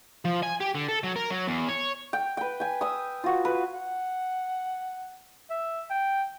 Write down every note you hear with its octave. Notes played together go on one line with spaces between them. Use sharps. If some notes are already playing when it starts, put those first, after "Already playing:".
F3
G#5
G4
D3
A4
F#3
A#4
F#3
E2
C#5
G5
B4 G5
G5 G#5
D#6 E6
F4 F#4
B4
F#5
E5
G5